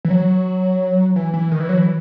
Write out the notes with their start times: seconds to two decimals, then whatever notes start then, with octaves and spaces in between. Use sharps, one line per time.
0.05 E3
0.10 F#3
1.16 E3
1.34 E3
1.52 D#3
1.60 E3
1.69 F#3
1.78 E3